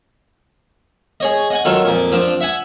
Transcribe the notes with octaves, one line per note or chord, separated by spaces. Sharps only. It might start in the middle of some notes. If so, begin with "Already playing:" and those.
G#4 C#5 D#5
D#5 F#5 G#5
D#3 F#3 F4 A4
F2 A#2
F3 C4 D4
E5 F#5 G#5